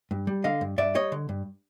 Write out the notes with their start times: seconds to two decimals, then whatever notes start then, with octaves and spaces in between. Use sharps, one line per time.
0.11 G2
0.27 G3
0.44 D3 D#5 F5
0.61 G2
0.78 G2 D5 E5
0.95 G3 C#5 D#5
1.12 D3
1.29 G2